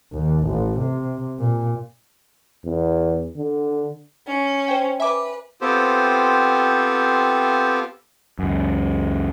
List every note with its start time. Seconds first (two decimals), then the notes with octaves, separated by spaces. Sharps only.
0.13 D#2
0.46 A1
0.80 C3
1.39 A#2
2.64 E2
3.36 D3
4.27 C#4
4.68 C5 G5
5.00 B4 E5 G#5 D6
5.61 B3 C4 F4 G4 A4 C5
8.39 C#2 F#2